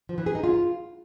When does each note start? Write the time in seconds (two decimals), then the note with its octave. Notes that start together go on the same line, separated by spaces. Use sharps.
0.09 F3
0.18 E3
0.26 G#4
0.35 D#4
0.44 F4